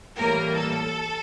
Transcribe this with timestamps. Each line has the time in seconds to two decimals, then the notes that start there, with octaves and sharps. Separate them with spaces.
0.17 A2 E3 G3 A#3 A#4
0.56 A4